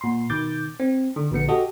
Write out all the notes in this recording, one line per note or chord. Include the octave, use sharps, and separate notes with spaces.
A#2 C6
B2 D#3 D6 G6 A6
C4
D3
A#1 D3 B3 C#7
F#4 G4 A4 D#5